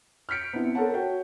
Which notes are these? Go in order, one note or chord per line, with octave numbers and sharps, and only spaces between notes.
F6 G6 B6 C#7 D7
B3 C4 D4 E4
A4 A#4 C5 C#5 F#5 A5
F#4 C#5 G5